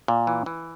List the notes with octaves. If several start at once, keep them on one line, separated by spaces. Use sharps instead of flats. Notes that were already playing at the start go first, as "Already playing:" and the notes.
A#2
E3
E3